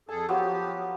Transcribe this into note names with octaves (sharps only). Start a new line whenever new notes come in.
F2 G#4 A4 A5
F3 F#3 B3 G4